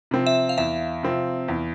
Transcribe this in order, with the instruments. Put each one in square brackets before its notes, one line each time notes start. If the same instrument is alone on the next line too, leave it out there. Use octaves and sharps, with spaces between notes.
[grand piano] C3 F3 C4
[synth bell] E5
F5
[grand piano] E2 [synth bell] E5
[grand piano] C3 F3 C4
E2